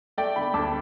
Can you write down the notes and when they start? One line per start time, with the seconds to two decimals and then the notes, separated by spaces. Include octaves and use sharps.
0.18 A3 D5 G5
0.36 D3 G5 B5
0.54 D2 A5 D6